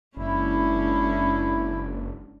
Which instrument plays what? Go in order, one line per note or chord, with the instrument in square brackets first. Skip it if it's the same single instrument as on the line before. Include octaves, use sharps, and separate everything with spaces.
[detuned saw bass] F#1 [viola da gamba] G#3 C#4 D4 [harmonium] E4